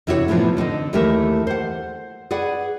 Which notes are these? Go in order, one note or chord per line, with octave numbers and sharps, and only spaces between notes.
E2 C3 E4 F#4 A4 C#5
A2 C3 E3 F3 B3
D3 B3 C4 D#4
D#2 E3 A3 G4 A#4 E5
C5 F#5
G#4 B4 D5 F#5